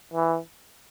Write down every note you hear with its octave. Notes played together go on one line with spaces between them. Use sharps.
E3